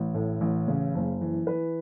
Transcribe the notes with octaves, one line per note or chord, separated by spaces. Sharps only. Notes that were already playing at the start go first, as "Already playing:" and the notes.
Already playing: A1
A2
A1
C#3
F#1
E3
E3 B4